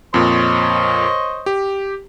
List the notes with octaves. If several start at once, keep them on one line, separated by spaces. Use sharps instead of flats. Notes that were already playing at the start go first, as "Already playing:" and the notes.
F2 A#2 C5 C#5 D#5
G4